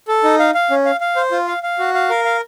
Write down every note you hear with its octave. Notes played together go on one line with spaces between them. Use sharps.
A4
D#4
F5
F5
C#4
F5
F5
C5
F4
F5
F5
F#4
F5
A#4
F5